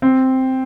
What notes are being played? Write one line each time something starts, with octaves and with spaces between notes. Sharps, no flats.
C4